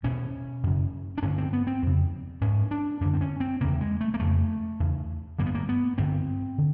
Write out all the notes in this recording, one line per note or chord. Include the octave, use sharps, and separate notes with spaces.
E2 B2 C#4
F#2 C#3
D4
G2 D3 C#4
C4
B3
C4
F2 C#3
G#2 C#4
D4
F#2 D3 D4
C4
C#4
C4
E2 C#3 A#3
G#3
A3
A#3
F2 C#3 A3
E2 C#3
G2 D3 A#3
B3
A#3
B3
G2 D3 C4
D3